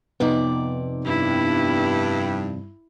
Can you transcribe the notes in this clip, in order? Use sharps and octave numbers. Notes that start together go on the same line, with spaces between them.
F2 C3 B3 D#4 D5
G2 E4